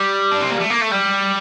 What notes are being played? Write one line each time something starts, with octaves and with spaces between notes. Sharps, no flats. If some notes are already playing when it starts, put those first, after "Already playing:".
Already playing: G3
D4
C4
A#3
A3
A#3
A3
G3